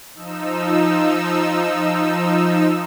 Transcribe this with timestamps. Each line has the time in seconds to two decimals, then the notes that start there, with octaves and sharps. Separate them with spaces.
0.14 F3 D#4 E6